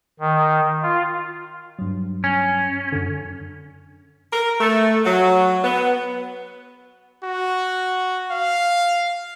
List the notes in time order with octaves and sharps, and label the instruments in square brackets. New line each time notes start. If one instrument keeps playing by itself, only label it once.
[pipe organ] D#3
F4
[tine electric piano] G2 F#3
[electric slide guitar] C#4
[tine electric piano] F#2 D3
[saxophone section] A#4
A3
F#3
B3
[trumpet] F#4
F5